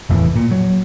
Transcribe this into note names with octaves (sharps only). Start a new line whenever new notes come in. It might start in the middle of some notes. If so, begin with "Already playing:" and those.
F1 E2 A2 E3
A#2
F#3